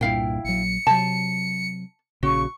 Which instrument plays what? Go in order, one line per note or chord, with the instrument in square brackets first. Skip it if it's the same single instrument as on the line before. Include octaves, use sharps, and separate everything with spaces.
[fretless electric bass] C2 G2 A#2 [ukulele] E4 F5 G5
[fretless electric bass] A#1 F#3 [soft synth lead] C#7
[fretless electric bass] C3 F#3 [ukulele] A5
[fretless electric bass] A#1 C#3 [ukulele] F#4 [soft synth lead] C#6